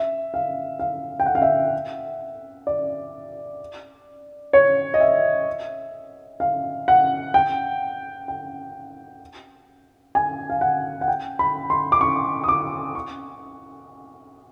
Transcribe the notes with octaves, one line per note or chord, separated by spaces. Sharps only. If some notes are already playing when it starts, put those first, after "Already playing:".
Already playing: E5
F5
F5
G5
F#5
F5
E5
D5
C#5
D#5
E5
F5
F#5
G5
G5
G#5
F5
F#5
F#5
G5
B5
C6
D6
C#6
D#6
D6
C#6